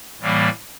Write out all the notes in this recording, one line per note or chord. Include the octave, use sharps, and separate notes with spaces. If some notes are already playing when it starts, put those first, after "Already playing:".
A2 E3 G3 A#3